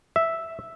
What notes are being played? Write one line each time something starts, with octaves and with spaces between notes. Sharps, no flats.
E5